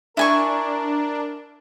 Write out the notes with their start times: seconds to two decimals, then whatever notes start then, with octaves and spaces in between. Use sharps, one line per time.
0.17 D4 E4 A#4 G#5 C#6